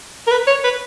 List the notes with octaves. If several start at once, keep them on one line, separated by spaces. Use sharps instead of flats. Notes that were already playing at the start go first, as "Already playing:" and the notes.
A#4
B4
C#5
B4